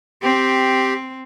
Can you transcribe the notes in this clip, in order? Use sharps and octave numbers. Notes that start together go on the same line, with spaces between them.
C4 G4